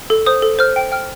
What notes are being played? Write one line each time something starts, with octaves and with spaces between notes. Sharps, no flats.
A4
C5 D#6
A4
C5 F6
G5
G5 F6